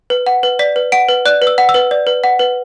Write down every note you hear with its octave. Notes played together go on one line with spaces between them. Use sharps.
B4
F#5
B4
D5 B6
B4
F#5 D7
B4
D5 F#6
B4
E6
F#5
E6
B4
D5
B4
F#5
B4